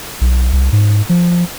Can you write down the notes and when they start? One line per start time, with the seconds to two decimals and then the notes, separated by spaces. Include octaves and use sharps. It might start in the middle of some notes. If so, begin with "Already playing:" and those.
0.21 B1
0.53 C2
0.72 G#2
1.09 F3